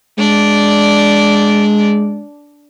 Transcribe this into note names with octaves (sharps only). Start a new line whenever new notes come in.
G#3 D4 D5